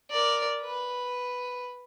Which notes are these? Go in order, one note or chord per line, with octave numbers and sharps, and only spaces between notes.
A#4 D5
B4